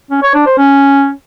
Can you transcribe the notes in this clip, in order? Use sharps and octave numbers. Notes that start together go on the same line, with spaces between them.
C#4
C#5
D4
C5
C#4